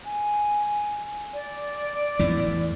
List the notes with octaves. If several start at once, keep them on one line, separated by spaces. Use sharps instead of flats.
G#5
D5
E2 A2 E3